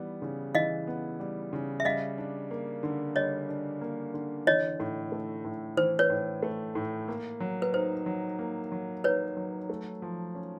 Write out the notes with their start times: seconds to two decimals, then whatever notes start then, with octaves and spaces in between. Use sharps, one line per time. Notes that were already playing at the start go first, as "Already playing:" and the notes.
Already playing: E3 G3 B3
0.22 C#3
0.55 E3 D#5 F5
0.87 B3
1.20 G3
1.53 C#3
1.80 E5
1.85 G3 D#5 F5
2.18 D4
2.51 A#3
2.83 D3
3.16 G3 C#5 D#5
3.49 D4
3.81 A#3
4.14 D3
4.46 E3 C#5 D#5
4.80 A2
5.12 A3
5.45 A2
5.77 E3 C5
5.99 B4 C#5
6.10 A2
6.42 A3
6.75 A2
7.08 A#3
7.40 F#3
7.62 B4
7.73 D#4 C5
8.06 F#3
8.39 A#3
8.72 F#3
9.04 D#4 B4 C#5
9.37 F#3
9.70 A3
10.02 F3
10.35 C#4